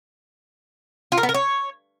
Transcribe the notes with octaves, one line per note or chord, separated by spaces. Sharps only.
F4
A#4
B3
A#4
C#5